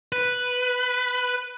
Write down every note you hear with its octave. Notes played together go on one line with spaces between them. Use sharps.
B4